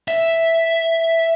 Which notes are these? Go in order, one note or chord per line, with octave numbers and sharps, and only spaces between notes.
E5